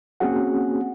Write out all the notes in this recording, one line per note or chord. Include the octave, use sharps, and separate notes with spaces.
A#3 C4 C#4 F#4 G#4 F#5